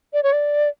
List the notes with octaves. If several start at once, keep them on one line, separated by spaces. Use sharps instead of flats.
D5
C#5
D5